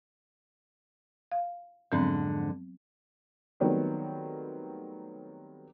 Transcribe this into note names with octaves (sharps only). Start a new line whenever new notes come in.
F5
F2 G#2 D3 F#3 B3 C4
D#3 F#3 G3 A3 B3 C4